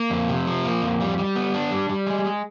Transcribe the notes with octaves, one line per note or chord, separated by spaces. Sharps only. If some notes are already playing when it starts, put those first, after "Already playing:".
Already playing: A#3
F2
C3
F3
A#3
F2
G3
G3
B3
D4
G3
G3
G#3
G#3